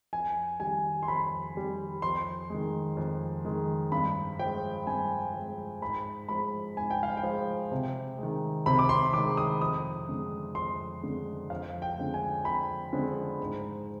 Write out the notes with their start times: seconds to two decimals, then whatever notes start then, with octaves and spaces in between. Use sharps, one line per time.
0.13 F2 G#5
0.60 D#3 G3 G#5
1.03 C6
1.08 F2 B5
1.55 D#3 G3
2.02 F2 C6
2.50 D#3 G#3
2.97 F2
3.45 D#3 G#3
3.92 G2 B5
4.39 F3 G#3 G5
4.87 G2 G#5
5.34 F3 G#3
5.82 G#2 B5
6.29 F3 G#3 B5
6.77 G#2 G#5
6.90 G5
7.03 F5
7.17 G5
7.23 F3 G#3
7.72 C3
8.18 D#3 G#3
8.66 C3 B5
8.79 D6
8.89 C6
9.13 D#3 D6
9.18 G#3
9.37 D#6
9.61 F2 D#6
10.09 D3 G#3
10.55 F2 C6
11.03 D3 G#3
11.50 F2 F5
11.82 G5
11.97 D3 F3 G#3
12.14 G#5
12.45 F2 B5
12.93 D3 F3 G#3
13.41 G#2